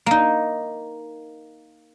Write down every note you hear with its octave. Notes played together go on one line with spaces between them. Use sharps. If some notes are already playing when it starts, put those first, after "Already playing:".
A#3 D#4